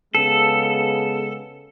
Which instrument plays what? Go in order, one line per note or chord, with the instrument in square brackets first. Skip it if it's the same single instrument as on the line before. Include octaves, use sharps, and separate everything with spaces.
[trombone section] C#3 G#3 B3 [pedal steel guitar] A4